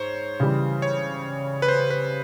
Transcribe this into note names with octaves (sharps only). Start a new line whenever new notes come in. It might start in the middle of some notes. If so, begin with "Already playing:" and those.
Already playing: G#2 C5 C#5
C#3 E3 G3
C#5
B4
C5
B4